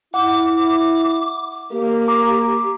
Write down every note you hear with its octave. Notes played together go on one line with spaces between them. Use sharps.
E4 F#5 D6
D6
A#3 G4
A#5 D6